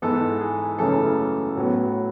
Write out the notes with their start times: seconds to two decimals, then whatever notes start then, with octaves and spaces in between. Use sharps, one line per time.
0.02 G#2 E3 G#3 B3 A4
0.40 G#4
0.78 F#2 C#3 E3 A3 A4
1.56 A2 F#3 B3